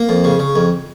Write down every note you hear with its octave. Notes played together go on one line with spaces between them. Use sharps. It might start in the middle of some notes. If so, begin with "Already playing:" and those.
Already playing: A#3
F2
C#3
C#3
F2